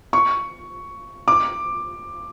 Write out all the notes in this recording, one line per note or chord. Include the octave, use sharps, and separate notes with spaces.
C#6
D6